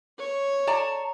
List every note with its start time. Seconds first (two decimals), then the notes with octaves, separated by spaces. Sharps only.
0.18 C#5
0.67 D5 A5 A#5